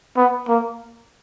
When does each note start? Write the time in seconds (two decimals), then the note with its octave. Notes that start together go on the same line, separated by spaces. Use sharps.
0.17 B3
0.48 A#3